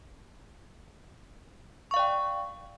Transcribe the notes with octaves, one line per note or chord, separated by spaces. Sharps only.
D5 F5 G5 C#6